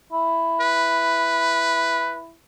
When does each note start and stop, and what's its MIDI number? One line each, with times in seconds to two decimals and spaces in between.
0.12 2.34 64
0.61 2.20 71